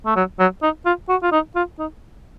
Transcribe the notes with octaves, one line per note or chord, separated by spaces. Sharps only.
A3
F#3
F#3
D#4
F4
F#4
F4
D#4
F4
D#4